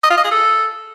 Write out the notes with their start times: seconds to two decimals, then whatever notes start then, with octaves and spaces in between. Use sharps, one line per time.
0.03 D#5
0.10 F4
0.17 D#5
0.24 G#4
0.31 A4